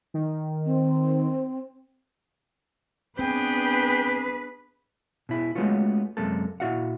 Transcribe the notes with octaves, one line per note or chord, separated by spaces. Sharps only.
D#3
C4
B3 C4 D4 G#4 B4 G5
B2 E4 G#4
G#3 A3 B3 C#4 F4 F#4
F#2 C3 G#3 A#3 A4
A#2 E4 F#4 F5 F#5